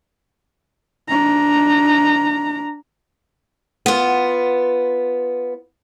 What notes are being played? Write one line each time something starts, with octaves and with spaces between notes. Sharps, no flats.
D4 A#5
B3 F4